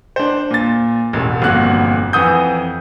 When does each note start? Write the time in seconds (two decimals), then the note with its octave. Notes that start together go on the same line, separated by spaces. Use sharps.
0.16 D4 C5
0.51 A#2 A6
1.13 E1 A1
1.42 G1 F2 A#2 F#4 F#6
2.13 F2 E3 F#5 D#6 G6